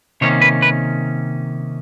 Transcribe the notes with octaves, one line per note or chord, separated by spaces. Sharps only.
C3 D#3 G3 A#3 C#4 C#5
B4
B4